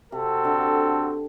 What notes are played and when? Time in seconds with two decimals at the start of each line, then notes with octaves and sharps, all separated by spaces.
0.11 C3 C4 F#4 A4
0.45 D3